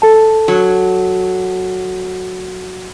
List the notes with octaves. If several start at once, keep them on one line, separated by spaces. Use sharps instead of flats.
A4 A5
F#3